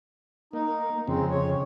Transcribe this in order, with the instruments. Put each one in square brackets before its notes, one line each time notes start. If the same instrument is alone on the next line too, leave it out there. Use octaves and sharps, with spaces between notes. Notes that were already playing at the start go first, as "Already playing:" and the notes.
[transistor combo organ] A#3 [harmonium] D#4
[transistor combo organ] F2 C#3 [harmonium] G#3 C4
[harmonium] C#5